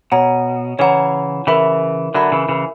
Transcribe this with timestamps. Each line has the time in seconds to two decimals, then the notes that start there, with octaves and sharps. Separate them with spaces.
0.12 B2 C#5 F#5 A#5
0.79 C#3 E3 C#5 F#5 A#5
1.47 C#3 E3 A#4 E5 B5
2.14 D3 F#3 A#4 E5 B5
2.32 C#3 E3
2.49 C#3 E3